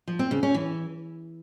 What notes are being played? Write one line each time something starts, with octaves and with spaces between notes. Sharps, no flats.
F3
C4
C#3
C#4
E3